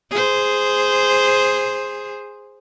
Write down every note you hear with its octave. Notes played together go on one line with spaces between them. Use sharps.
G#4 C5